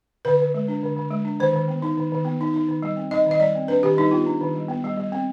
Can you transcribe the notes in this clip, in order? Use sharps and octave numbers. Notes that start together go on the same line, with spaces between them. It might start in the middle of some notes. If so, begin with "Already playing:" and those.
D3 B4
D3
G#3
D4
D3
D3
G#3
D4
D#3 C5
D#3
B3
D#4
D#3
D#3
B3
D#4
D#4
D#3
G3
C4
D#4 D#5
D#3
D#5
G3 D5
C4
D4 B4
D#3 G4
G3 D#4
B3 F4
D4
D#3
G3
B3
G3
G3
C4